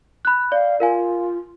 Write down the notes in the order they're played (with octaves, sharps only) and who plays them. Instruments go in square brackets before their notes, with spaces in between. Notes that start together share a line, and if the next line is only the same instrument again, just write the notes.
[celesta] B5 F#6
[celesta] D5 [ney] F5
[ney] F4 [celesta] A#4 F5 G#5